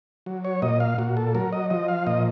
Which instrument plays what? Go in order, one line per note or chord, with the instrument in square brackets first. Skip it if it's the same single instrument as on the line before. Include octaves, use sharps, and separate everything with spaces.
[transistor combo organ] F#3
C#5
A#2 D#5
F5
A#2 F#4
A4
F#3 A#4
D#5
F3 D#5
F5
A#2 D#5